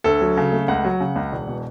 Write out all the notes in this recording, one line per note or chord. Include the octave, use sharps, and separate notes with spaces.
D2 A4
F#3
C#3
A3
C#2 F#5
F#3
C#3
C#2
E1
B2